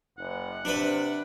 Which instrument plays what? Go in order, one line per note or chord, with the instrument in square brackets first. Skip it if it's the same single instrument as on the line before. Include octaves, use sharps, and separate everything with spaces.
[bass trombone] F#1 [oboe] F#5
[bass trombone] C3 [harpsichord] D4 B4